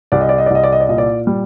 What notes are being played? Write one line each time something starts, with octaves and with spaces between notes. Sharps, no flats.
C2 D5
D#5
D5
D#5
D5
C2 D#5
D5
D#5
D5
A#2 D#5
D5
G3